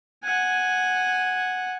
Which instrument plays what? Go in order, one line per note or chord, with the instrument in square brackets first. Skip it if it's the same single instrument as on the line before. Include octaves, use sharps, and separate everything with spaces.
[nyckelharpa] F#5 G#5